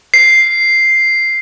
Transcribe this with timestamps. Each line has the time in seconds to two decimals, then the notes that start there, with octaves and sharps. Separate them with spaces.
0.14 C7